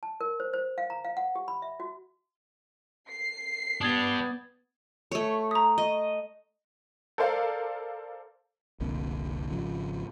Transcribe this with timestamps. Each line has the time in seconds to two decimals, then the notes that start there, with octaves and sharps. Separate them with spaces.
0.03 A5
0.21 A#4
0.40 C5
0.53 C5
0.78 F5
0.90 A#5
1.04 F5
1.17 F#5
1.35 G4
1.48 B5
1.62 E5
1.80 F#4
3.11 C7
3.81 B3 D4 G4 D#6 G#6 A6
5.11 A3 C#5
5.51 A#5 D#6
5.78 D#5
7.18 A4 A#4 C5 D5 F5
8.80 F1 C2 A#2 D3
9.49 G#1 C#3 F3